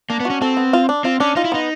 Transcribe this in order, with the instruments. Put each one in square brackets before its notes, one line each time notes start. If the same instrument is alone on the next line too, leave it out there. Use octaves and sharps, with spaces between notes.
[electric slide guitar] A#3 [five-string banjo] D4
[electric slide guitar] B3
[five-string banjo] F#4
[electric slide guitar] C#4
[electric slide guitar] C4 [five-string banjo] A4
[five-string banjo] B3
F4
D4
[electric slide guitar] C4 [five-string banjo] F4
[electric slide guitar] C#4 [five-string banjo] D4
[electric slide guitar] D#4 [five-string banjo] F4
[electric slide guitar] E4
[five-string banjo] B3 [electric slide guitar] D#4